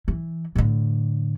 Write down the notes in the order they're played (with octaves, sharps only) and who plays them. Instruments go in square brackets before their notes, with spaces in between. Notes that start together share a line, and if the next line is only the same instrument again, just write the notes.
[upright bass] E3
A2 D3